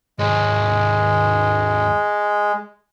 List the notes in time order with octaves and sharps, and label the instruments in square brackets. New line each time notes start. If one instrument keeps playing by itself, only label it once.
[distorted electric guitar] D#2 G#2 [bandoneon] G#3